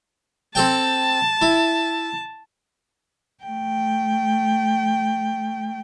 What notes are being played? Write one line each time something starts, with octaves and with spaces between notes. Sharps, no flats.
C4 A4 G5 A5
E4
A3 G5